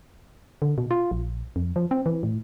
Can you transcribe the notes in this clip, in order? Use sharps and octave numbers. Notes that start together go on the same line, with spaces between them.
D3
B2
F4
A#1
F2
F3
C4
E3
A2